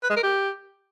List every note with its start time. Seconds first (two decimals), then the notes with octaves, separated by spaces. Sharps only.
0.03 B4
0.10 G#3
0.16 A#4
0.23 G4